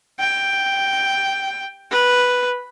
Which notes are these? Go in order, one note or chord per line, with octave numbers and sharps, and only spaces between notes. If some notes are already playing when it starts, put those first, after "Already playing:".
G5
B4